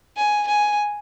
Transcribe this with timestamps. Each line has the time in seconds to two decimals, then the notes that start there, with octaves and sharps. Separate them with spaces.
0.17 G#5
0.48 G#5